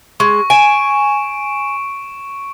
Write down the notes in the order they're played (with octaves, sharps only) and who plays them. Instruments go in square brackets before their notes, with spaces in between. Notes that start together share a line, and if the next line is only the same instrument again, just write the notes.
[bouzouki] G#3 [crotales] C#6
[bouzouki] G#5 [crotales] D7 E7